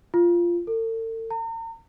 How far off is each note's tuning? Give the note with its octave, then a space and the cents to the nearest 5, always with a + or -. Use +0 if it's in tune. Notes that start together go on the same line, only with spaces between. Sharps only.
F4 -10
A4 +45
A#5 -40